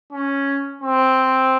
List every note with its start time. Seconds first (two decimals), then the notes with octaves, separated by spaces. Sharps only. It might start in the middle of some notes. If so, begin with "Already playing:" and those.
0.12 C#4
0.82 C4